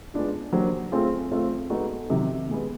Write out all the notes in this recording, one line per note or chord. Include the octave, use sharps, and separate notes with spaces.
G#3 B3 D4 F4
F#3 A#3 D4 G4 C5
A3 C4 F4 G#4
A3 C4 F4
G#3 B3 D#4 F#4 A4
C3 D#3 F#3
B2 G#3 B3